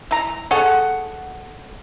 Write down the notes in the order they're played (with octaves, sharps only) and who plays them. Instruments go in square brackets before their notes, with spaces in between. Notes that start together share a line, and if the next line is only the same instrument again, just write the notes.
[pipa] E4 A#5
[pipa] G#4 A4 C#5 [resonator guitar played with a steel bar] F#5